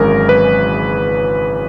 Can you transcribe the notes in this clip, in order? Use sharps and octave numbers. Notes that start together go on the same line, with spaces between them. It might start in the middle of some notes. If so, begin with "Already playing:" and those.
Already playing: G#1 F#2 C#3 E3 G#3 A#4
B4